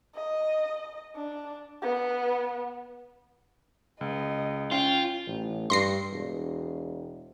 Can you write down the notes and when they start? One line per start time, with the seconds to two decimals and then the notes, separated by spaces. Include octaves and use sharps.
0.15 D#5
1.15 D4
1.82 B3
4.01 C#2 D#5
4.71 C#4 F4 G5
5.26 A1
5.70 G2 C6 A#6 C7
6.11 E1